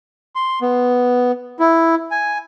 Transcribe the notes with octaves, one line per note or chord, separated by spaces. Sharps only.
C6
B3
E4
G#5